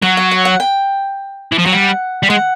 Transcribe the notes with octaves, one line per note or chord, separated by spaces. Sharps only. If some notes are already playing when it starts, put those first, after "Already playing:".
F#3 F#5
F#5
F#5
F#5
G5
E3
F3
F#3 G5
G3 F#5
G3
G#3 F#5